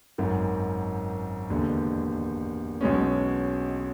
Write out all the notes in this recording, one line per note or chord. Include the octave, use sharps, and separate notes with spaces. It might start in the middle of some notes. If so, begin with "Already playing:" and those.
G#1 F#2 D#3
E1 D#2 D3
B1 B2 G#3 C#4